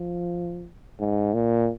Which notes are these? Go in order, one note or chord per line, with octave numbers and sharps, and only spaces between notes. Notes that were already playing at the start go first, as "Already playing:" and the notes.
Already playing: F3
G#2
A#2